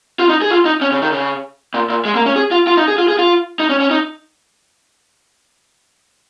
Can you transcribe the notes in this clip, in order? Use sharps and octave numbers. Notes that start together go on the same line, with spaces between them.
F4
D#4
G#4
F4
D#4
C#4
C#3
D#3
C#3
A#2
A#2
G#3
A#3
C#4
G#4
F4
F4
D#4
G#4
F4
G#4
F4
D#4
C#4
C#4
D#4